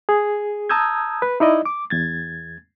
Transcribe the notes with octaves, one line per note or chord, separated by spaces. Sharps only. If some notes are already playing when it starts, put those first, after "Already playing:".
G#4
A5 A#5 D#6 E6 G6 G#6
B4
D#4 E4 D5 D#5
D6
E2 G#6 A6